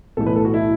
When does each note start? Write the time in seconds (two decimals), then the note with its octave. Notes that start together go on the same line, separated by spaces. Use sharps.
0.17 B1 A2 E3 A3 A4
0.26 B4
0.36 A4
0.45 F#4
0.54 E4